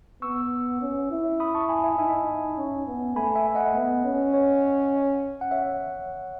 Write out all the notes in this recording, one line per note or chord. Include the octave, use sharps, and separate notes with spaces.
B3 C#6 E6
C#4
E4
B5 D#6
A5 C#6
G#5 B5
E5 G#5
D#4 E5 G#5
C#4
B3
A3 G#5 B5
E5 G#5
D#5 F#5
B3
C#4
C#5
F#5
C#5 E5